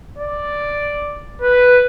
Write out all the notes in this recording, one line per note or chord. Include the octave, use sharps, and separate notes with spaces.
D5
B4